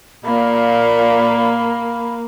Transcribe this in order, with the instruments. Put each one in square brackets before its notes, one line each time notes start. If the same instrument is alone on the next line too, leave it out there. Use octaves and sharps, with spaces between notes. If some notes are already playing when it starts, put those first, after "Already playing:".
[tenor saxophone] A#2 [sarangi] A#3 [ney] B5